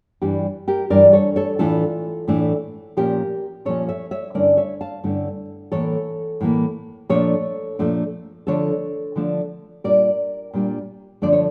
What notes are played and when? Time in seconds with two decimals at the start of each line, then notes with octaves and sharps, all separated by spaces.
0.22 G2 E3 G3 D4 G4
0.68 G4 A#4
0.90 G2 E3 G3 D4 A#4 D5
1.13 A4 C#5
1.36 A4 C#5
1.59 A2 E3 A3 D4 F4 A4
2.28 A2 E3 A3 D4
2.97 A#2 F3 C#4 G4 A#4
3.65 A#2 F3 C#4 A4 C#5
3.89 C#5 E5
4.11 C#5 E5
4.34 G2 D3 A3 C#4 E4 A#4 D5
4.57 C#5 E5
4.81 F5 A5
5.03 G2 D3 A3 C#4 E4
5.72 A2 E3 A#3 A4 C#5
6.41 A2 E3 A#3
7.09 A#2 F3 A3 D4 A4 C#5
7.79 A#2 F3 A3 D4
8.47 D3 F3 A3 D4 A4 C#5
9.16 D3 F3 A3 D4
9.84 A#2 G3 D4 F4 A#4 D5
10.54 A#2 G3 D4 F4
11.22 D3 F3 A3 D4 D5
11.33 C#5